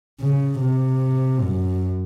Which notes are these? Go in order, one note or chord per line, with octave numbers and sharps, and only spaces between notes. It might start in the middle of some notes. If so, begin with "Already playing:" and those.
C#3
C3
F#2